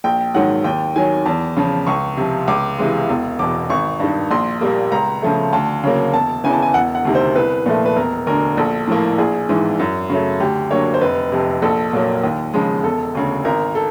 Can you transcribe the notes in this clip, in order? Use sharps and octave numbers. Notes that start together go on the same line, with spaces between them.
A#1 G5
G#2 D#3 F#3 F#5
D#2 G5
D#3 F#3 G#5
E2 A5
C#3 F3
C#2 C#6
C3 F3
C#2 D6
C3 E3 G#3
E1
E2 B2 D6
G#1 C#6
G2 D#3
A#1 C6
A#2 G3 A#3
C#2 A#5
C#3 F3 A3
D2 A5
C#3 F#3 A#3
E1 A5
E2 C#3 E3 G#5
A5
G#5
E1 F#5
F#5
D2 C3 D#3
C5
C2 B4
A#2 F3 A3
B4
E1 A#4
D2 D3 A#4
A#1 A4
A2 F3 A#3
A#1 G#4
G#2 E3
F#2
C#3 F#3 A3
D2 G4
D3 F#3 A#3 C#5
C5
F1 B4
F2 C3
A#1 A4
A#2 F#3 A#3
D#2
C#3 F3 G#3
E1 A4
D2 C#3
G#1 A#4
A4